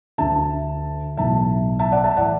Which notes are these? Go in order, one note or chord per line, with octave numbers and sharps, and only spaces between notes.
D2 D3 E5 A5
B1 A2 E3 E5 A5
E5 A5
D5 F#5
E5 A5
A2 E3 D5 F#5